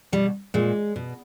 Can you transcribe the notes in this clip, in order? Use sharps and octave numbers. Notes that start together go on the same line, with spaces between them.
B2 G3
A#2 G#3
B2